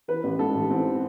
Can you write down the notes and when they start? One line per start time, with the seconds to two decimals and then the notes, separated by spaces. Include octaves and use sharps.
0.08 E3 B4
0.24 A1
0.39 G#2 A4
0.54 A1
0.70 E3 C4